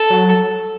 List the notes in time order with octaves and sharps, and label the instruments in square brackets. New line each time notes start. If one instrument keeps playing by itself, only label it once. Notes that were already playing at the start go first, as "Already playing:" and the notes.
Already playing: [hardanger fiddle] A4
[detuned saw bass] F#3